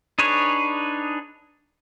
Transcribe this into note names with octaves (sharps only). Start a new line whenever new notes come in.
D4 D#4 G#4 B4 C#5